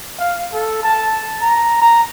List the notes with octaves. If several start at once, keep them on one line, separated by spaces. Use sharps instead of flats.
F5
A4
A5
A#5
A#5